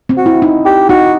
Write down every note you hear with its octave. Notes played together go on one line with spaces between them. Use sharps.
C4
F#4
E4
D#4
G4
D#4 F#4